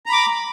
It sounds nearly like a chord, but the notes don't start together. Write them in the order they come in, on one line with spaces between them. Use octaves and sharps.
A#5 B5 D6